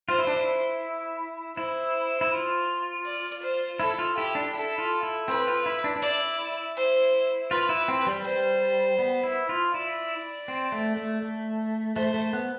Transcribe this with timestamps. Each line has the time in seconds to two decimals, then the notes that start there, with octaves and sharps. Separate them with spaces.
0.09 F4 C5
0.18 E4
0.27 D4
0.36 E4
1.57 E4 C5
2.21 E4
2.32 F4
3.06 D5
3.42 C5
3.80 E4 A4
3.99 F4
4.17 E4 G4
4.35 D4
4.54 E4 A4
4.78 F4
5.03 E4
5.28 C4 B4
5.47 F4
5.66 E4
5.84 D4
5.96 D4
6.02 E4 D5
6.77 C5
7.51 F4 B4
7.69 E4
7.88 C4
8.07 G3
8.25 G3 C5
8.99 B3
9.23 E4
9.49 F4
9.73 E4 D5
10.48 C4
10.72 A3
10.97 A3
11.22 A3
11.96 A3 C5
12.14 A3
12.33 B3